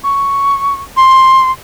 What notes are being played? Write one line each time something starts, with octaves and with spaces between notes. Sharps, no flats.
C#6
C6